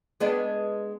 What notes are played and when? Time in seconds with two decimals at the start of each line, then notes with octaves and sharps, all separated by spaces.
0.20 G#3 B3 D4